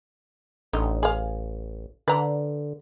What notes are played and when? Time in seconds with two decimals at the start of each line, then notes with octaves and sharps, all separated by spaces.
0.73 A1 D3 D#4
1.03 G#4 F5
2.08 D3 B4 A#5